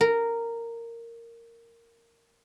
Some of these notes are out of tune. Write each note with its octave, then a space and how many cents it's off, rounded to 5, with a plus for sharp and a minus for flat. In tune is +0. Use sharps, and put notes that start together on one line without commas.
A#4 -10